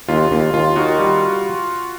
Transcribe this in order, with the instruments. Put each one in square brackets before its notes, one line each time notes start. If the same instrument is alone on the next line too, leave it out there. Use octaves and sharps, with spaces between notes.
[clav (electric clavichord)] D#2 [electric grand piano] F4
[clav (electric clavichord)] D#2
[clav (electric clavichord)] D#2 [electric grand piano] F4
[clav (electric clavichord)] D#3 [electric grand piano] F#4
[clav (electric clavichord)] G3